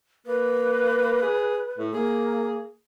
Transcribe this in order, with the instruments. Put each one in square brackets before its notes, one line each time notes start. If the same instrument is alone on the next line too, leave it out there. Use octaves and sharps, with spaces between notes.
[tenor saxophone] A#3 [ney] B4
[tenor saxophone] G#4
A2
[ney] A#3 [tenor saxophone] G#4